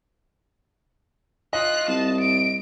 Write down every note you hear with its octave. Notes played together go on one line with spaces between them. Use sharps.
F4 D#5 F#6
C2 A5
D7